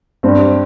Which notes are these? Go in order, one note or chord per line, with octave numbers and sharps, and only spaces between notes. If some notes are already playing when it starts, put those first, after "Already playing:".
G2 C4